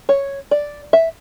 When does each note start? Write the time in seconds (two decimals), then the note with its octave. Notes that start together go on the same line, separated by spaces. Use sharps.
0.09 C#5
0.51 D5
0.93 E5